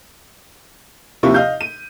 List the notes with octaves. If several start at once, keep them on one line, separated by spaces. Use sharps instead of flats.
D#2 C3 F3 E4 G4 C#6
D#5 F5 G6
D#7